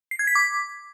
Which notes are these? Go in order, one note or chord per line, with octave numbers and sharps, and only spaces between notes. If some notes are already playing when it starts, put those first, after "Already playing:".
C7
G#6
B6
D6